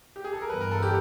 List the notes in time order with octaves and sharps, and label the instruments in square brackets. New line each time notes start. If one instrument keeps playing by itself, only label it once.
[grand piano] G4
G#4
A4
A#4
[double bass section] G2 E3 G3 B3 [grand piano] B4
[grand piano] A#4
A4
G4